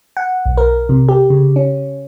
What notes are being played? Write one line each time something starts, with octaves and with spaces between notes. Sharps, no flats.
F#5
B1
A#4
C3
G4
C#3
C#4